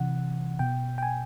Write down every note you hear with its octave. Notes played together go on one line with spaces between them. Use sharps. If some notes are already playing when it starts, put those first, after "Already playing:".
Already playing: C3 E3 F#5
B2 G5
G5
G#5